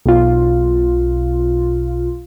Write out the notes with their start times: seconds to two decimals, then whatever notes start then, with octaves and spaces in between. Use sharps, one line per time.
0.06 B1 F4